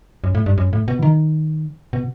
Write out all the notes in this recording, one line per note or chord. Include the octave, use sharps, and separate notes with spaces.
F#2
A2
G2
F#2
A2
B2
E3
D#3
B2